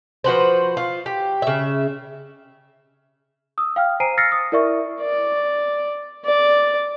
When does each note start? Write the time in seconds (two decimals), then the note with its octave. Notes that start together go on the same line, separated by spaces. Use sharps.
0.24 F3 F#4 B4 C5
0.77 F4
1.06 G4
1.42 C#3 E5
3.58 D#6 E6
3.76 F5 G5 F6
4.00 C5 G#5 A#5 C7 D7 D#7
4.17 E6 F6 A6 A#6 C7 C#7
4.32 D#6
4.52 E4 A#4 D5 E5 C#6
5.01 D5
6.25 D5